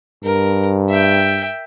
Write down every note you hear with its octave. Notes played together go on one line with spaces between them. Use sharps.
G2 A#4
E5 G5